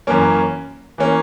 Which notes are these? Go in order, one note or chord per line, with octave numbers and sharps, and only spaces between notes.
F#2 E3 A#3 C#4
E3 A#3 C#4